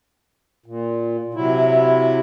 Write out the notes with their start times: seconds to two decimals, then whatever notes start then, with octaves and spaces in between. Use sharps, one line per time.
0.66 A#2
1.34 C3 F#3 E4